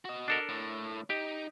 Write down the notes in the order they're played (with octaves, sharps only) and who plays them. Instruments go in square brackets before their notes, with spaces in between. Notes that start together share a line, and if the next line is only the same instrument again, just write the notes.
[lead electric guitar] F#4 D#5
[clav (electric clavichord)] D4 A4 A#4
[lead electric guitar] A2
[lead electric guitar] D#4 [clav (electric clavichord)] G4